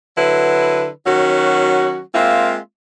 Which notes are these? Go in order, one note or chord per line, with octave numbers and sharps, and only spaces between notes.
D3 F#3 E4 B4
D#3 F#3 C#4 F#4
G#3 A#3 C4 F4 E5